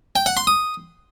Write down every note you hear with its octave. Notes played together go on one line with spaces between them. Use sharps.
G5
F#5
C6
D#6